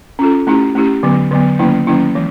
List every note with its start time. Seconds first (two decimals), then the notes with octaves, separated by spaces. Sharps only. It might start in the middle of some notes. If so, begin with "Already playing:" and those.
0.19 C#4 F4 A4
0.47 A3 C#4 E4 G4
0.75 A3 C#4 E4 G4
1.03 D3 F#3 B3
1.31 D3 F#3 B3
1.59 D#3 F#3 A#3 C#4 E4
1.87 D#3 F#3 A#3 C#4 E4
2.15 E3 G#3